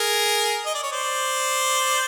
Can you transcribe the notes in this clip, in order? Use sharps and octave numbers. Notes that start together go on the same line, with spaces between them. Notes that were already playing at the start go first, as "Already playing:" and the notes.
Already playing: G#4 A#4
D#5
D5
C#5
C5 D5